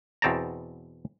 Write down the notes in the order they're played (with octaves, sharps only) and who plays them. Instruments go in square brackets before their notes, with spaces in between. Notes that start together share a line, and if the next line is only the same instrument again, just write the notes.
[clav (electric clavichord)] E2 B2 C4 D5 A5 A#5